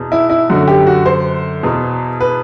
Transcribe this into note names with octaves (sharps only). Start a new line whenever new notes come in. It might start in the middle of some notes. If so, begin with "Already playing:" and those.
Already playing: E2 B2
E4
E4
F#2 D3 F#4
G4
F#4
C5
E2 B2
B4